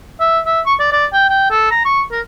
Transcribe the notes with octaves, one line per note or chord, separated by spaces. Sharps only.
E5
E5
C#6
D5
D5
G5
G5
A4
A#5
C#6
A#4